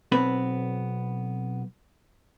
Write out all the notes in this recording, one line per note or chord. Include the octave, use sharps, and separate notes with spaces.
B1 B3 C4 B4